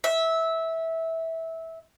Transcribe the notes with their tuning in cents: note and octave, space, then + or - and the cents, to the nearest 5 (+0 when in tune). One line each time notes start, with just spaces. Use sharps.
E5 -15